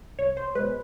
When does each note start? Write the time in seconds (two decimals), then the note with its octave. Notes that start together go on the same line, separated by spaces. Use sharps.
0.19 C2 C#5
0.37 C5
0.55 B2 G#3 B4